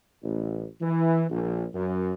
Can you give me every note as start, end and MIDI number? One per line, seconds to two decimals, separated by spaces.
0.23 0.64 33
0.82 1.25 52
1.30 1.64 34
1.75 2.14 42